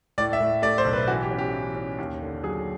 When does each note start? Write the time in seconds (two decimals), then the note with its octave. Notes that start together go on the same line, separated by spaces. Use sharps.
0.18 A2 D5
0.33 E5
0.40 A2
0.62 A3 D5
0.78 C5
0.85 B1
0.93 B4
1.08 E3 F#4
1.23 G4
1.30 C#4
1.38 G4
1.53 E3
1.76 C#4
1.98 D#2
2.22 D3
2.43 F#3 G#4